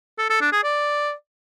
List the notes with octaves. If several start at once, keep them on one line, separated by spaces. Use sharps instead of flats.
A4
A4
D4
G#4
D5